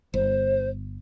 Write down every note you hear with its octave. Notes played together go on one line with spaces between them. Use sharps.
G1 C5